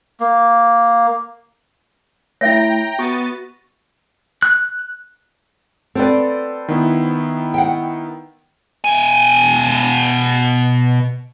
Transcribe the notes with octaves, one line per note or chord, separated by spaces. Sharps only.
A#3
A3 E4 C#5 E5 G5 A#5 A#6
B3 F#4 C#6 A6 D#7
F#6
C4 F#4 A4 B4 D5
D#3 B3 E4
F#5 G5
B2 G#5